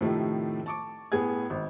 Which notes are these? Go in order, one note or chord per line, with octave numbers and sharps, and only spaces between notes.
A2 C3 D#3 F3 A3
A5 C#6 D6
A2 B3 G#4 G#5 G#6
G#1